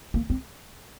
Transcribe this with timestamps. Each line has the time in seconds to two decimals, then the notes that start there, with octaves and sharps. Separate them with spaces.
0.14 A#3
0.30 C4